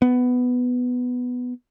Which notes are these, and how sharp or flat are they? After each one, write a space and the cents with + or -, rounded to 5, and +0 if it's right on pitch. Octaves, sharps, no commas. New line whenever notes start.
B3 +5